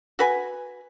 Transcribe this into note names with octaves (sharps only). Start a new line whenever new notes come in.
F#4 B4 G#5